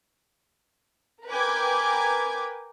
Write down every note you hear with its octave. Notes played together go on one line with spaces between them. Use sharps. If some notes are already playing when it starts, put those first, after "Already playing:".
A#4 B4 G5 G#5 D6 G#6